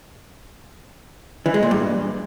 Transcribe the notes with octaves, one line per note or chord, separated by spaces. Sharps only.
E3
G#3
A#2
G2